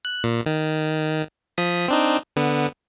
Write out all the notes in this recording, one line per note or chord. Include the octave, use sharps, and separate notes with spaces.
F#6
A#2
D#3
F3 D#6 B6
C4 D4 D#4
D3 B3